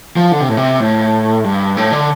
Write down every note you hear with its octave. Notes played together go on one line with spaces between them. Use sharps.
F3
D3
C3
A2
C3
A2
G2
A2
D3